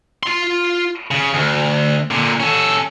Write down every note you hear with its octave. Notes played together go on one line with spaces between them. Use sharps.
F4 C6
C#3
D2
A#2 D3
C#4 A4